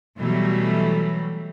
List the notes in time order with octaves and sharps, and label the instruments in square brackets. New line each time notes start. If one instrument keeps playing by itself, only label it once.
[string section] B2 E3 F#3 G3 A3